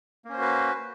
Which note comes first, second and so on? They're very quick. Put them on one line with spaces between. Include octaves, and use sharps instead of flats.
A#3 C#4 C5 F#4 B4